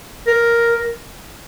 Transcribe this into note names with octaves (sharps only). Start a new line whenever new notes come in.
A#4